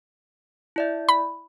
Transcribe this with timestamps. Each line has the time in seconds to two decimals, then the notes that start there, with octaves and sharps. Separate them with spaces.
0.76 E4 D5 E5
1.09 B5